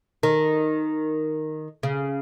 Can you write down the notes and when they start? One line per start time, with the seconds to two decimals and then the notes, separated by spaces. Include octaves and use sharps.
0.23 D#3
1.83 C#3